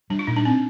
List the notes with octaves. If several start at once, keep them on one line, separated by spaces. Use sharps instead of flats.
G3 D4
F4
A#2 D#4
D4
C4